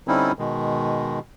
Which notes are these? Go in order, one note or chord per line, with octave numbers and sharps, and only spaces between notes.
D3 G3 C4 C#4 D#4 E4
B2 D#3 G#3